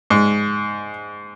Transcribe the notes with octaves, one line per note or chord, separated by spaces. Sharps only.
G#2